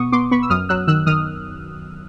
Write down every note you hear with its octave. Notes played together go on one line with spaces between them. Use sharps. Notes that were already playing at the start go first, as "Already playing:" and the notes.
Already playing: B2 B3 C#6 D#6
B3 C6 D6
B3 B5 C#6
E6
F#2 D#6 F6
F#3 E6 F#6
D#3 E6 F#6
D#3 D#6 F6